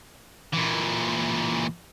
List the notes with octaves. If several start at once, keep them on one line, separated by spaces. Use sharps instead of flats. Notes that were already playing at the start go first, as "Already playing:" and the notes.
A#2 E3